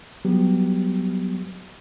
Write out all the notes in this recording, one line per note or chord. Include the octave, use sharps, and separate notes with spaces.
F#3 G3 B3 G4